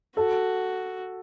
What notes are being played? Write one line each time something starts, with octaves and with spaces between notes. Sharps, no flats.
F#4 A4